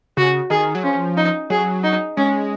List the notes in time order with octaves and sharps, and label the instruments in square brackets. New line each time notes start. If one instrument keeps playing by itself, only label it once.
[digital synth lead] C#3 [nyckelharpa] F#4
[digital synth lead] D#3 [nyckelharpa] G#4
[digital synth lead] F#3
[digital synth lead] F3 [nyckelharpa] C#4
[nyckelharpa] D#4
[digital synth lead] F#3 [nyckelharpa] G#4
[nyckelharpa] D#4
[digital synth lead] G#3 [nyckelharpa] C#4